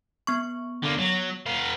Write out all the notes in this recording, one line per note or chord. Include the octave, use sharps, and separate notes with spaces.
B3 C#6
D3 A#3
F#3
B3 F5